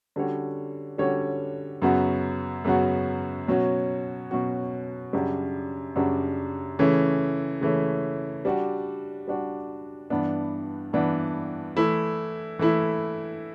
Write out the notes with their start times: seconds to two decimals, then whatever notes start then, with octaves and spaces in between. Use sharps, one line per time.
0.16 D3 G3 C#4 F#4 C#5
0.98 D3 G3 C#4 F#4 C#5
1.82 F#2 C#3 F#3 B3 F#4
2.64 F#2 C#3 F#3 B3 F#4
3.48 B2 F#3 C#4 F#4
4.31 B2 F#3 C#4 F#4
5.13 F#2 C#3 G3 D4 F#4
5.96 F#2 C#3 G3 D4 F#4
6.79 C#3 E3 A3 C#4
7.61 C#3 E3 A3 C#4
8.45 G3 D4 F#4
9.28 G3 D4 F#4
10.10 G2 E3 B3 D4
10.93 G2 E3 B3 D4
11.77 E3 A3 E4
12.59 E3 A3 E4